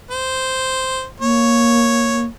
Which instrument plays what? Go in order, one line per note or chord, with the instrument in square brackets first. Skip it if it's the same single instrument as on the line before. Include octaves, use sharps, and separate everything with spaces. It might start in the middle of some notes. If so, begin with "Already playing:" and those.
[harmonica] C5
[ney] A#3 [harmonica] C#5